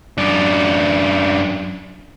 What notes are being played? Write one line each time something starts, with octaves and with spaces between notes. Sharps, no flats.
F#2 D4